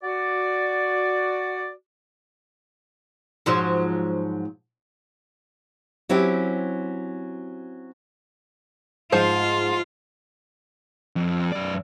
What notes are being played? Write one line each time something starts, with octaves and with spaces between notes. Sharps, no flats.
F#4 D5
G#2 F3 F#3
F#3 C4 C#4 E4 F#4 G4
G#2 F3 F4 C5
F2
F#2 D5